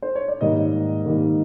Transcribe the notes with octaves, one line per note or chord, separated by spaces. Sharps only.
C5
C#5
D5
G#2 D#3 G3 A#3 D#5
G#2 D#3 G3 A#3